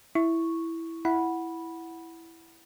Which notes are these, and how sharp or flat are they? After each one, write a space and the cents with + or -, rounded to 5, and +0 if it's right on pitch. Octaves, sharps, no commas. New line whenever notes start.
E4 +0 C#6 +0
E4 +5 F#5 +0 B5 -10